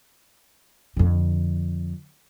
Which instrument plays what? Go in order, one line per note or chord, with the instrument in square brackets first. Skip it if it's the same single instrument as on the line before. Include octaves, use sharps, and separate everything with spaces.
[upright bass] F2 D3